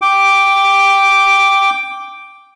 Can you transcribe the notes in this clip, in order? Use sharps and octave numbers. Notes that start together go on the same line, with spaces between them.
G5 D6